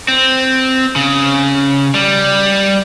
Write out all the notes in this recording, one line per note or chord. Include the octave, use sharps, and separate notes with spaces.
C4
C#3
G3